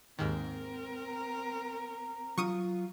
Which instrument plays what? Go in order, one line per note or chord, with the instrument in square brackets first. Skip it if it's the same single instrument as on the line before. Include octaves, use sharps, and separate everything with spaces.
[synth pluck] D#2 G#2 D#3 [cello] C4 A#4
[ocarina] A#5
[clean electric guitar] F#3 F4 [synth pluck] C#6 D#6 D#7